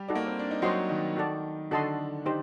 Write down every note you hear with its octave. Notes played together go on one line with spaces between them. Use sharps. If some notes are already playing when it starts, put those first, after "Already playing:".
Already playing: G3 G4
D#4 F#4 A4 D5
A#3
C4
D4
D#4
F#3 F#4 C5 D#5 G5 C6
D#3 D#4
F#4 A4 D5 A5
D3 D4 F#4 A4 D#5 A5 C6
D#4 G4 C5